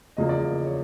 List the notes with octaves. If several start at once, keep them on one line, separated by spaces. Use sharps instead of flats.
E2 C#3 F3 A#3 D#5
D5
D#5
D5
C#5